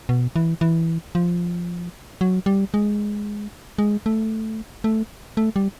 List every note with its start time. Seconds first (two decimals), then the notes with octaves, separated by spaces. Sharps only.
0.09 B2
0.36 E3
0.61 E3
1.15 F3
2.21 F#3
2.46 G3
2.74 G#3
3.78 G#3
4.06 A3
4.84 A3
5.37 A3
5.56 G3